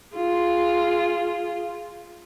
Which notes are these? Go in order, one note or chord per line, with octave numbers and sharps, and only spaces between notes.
F4 G#4